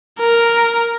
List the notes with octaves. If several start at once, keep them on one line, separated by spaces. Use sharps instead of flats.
A#4